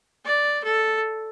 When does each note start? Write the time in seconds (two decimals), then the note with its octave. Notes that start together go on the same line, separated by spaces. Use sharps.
0.25 D5
0.64 A4